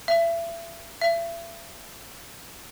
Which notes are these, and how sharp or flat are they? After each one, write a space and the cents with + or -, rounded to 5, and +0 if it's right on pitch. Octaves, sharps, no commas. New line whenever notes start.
E5 +30
E5 +35